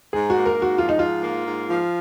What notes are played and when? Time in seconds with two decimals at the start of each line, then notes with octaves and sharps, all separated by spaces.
0.13 G#2 G#4
0.30 F#4
0.35 A#3
0.46 A#4
0.57 G#2
0.62 F#4
0.78 F3 F4
0.89 D#4
0.99 G#2 F4
1.22 A#3
1.45 G#2
1.66 F3